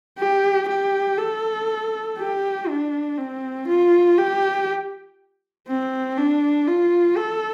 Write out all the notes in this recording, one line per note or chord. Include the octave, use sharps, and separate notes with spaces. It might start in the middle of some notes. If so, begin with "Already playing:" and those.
G4
G4
A4
G4
D4
C4
F4
G4
C4
D4
F4
A4